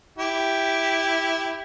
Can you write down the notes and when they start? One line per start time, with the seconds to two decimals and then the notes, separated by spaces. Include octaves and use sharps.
0.18 E4 G4